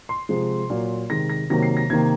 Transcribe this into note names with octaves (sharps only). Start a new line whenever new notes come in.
C6
C3 F3 G#3
A#2 F#3 A#3
C3 D#3 G#3 A#6
A#6
C3 D#3 F#3 A#3 A#6
C7
A#6
C3 D#3 A#3 G#6